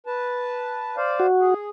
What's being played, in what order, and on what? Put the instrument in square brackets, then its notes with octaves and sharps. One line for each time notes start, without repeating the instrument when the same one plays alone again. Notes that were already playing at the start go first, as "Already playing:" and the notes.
[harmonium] B4 A5
C5 D5 F5
[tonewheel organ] F#4
[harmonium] G#4